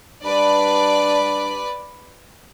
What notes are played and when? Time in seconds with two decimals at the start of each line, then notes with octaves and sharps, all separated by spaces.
0.23 G3 D4 B4 D5